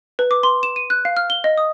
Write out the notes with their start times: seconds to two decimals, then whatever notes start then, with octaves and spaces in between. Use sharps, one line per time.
0.19 B4
0.31 D6
0.43 C6
0.63 E7
0.76 D#7
0.90 F#6
1.05 F5
1.17 F6
1.30 G7
1.44 D#5
1.58 D#6